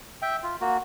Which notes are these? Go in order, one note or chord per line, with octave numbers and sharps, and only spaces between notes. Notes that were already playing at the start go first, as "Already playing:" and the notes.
E5 G5
F4
A#3 F#4